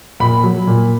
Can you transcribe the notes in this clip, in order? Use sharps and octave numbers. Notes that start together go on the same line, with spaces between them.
A#2 B5
F#3
A#2